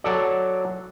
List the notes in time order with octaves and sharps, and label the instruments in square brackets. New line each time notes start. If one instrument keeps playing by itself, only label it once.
[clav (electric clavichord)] F#3 A4 D5